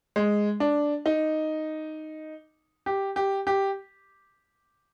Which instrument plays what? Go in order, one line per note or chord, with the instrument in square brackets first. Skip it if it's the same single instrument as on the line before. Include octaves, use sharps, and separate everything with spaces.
[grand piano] G#3
D4
D#4
G4
G4
G4